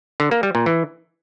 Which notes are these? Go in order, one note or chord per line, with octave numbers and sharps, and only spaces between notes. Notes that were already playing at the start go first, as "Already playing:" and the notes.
D3
A#3
G3
A#2
E3